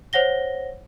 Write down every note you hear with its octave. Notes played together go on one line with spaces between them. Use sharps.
C5 C#5 F#5 A#6 G7